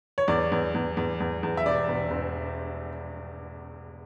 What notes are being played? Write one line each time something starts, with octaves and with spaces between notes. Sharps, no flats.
C#5
E2 D5
E2
E2
E2
E2
E2
E5
E1 D5
E1
E1